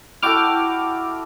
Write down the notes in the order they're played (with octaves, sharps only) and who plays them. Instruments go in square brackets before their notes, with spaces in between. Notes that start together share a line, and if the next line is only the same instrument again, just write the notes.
[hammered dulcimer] E4 F#4 A4 [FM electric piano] G5 D6 F6